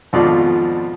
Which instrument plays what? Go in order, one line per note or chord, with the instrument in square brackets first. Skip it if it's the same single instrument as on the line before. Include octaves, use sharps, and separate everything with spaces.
[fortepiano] G#1 F2 B2 F3 F4 D5